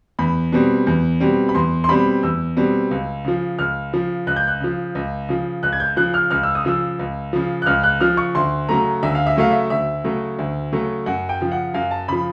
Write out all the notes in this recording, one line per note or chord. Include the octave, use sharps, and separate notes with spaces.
E2 B5
B2 G3 C4
E2
B2 G3 C4
B5
E2 C6
C6
B2 G3 C4 B5
E2 E6
B2 G3 C4
C#2
C#3 F3
C#2 F6
C#3 F3
C#2 F#6
G6
F#6
C#3 F3
C#2
C#3 F3
C#2 F#6
G#6
G6
C#3 F3 F#6
F6
C#2 F6
E6
D#6
C#3 F3 E6
C#2
C#3 F3
F#6
C#2 F6
F#6
C#3 F3 F6
C#6
D2 C6
C#3 F#3 A3 A#5
D2 E5
F5
E5
C#3 F#3 A3 F5
E5
D2 E5
C#3 F#3 A3
D2
C#3 F#3 A3
F#2 F#5
G5
C#3 F3
F#5
F#2 F5
A5
C#3 F3 B5